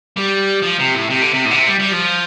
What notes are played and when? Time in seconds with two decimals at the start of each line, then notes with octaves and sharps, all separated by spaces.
0.17 G3
0.63 F3
0.79 C3
0.95 A2
1.10 C3
1.22 D3
1.34 C3
1.45 A2
1.51 D3
1.56 C3
1.68 G3
1.80 G3
1.91 F3